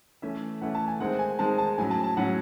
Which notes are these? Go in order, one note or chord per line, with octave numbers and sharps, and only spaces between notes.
E3 A3 C#4 E5
E3 A3 C#4 F#5
A5
G#5
D#3 G#3 C4 F#5
G#5
D#3 G#3 C4 A5
A5
A2 F#3 C#4 G#5
A5
A5
A2 F#3 C#4 F#5